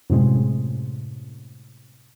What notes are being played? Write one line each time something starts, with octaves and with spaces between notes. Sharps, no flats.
F#2 A2 C3 G#3